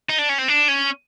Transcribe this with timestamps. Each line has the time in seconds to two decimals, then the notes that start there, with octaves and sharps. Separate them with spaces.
0.10 D#4
0.19 D4
0.30 C#4
0.39 C4
0.48 D4
0.69 C#4